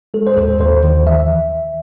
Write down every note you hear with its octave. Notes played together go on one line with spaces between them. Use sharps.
G#3 A4
C5
D#2 A4
D#2 C5
D#3
E3 E5